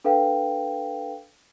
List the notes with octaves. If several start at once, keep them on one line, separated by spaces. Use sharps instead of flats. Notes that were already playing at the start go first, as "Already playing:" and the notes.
D4 A4 B4 F5 G5